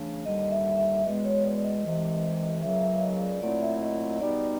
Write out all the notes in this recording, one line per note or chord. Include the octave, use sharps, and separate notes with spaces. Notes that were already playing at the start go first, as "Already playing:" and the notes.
Already playing: C#3 E3 A3 D4
D#2 D3 G3 D#5
E5
E5
E2 B2 G#3 B3 D#5
C#5
D5
D#5
C2 C3 E3 G#3 D#5
C#2 C#3 F#3 A#3 E5
E5
D#5
D5
A#2 F#3 A3 C4 E4 D5
E5
D#5
D#5
B2 G3 B3 D#4 D5